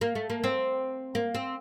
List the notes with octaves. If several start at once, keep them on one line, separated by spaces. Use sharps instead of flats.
A#3
A3
A#3
C4
A#3
C4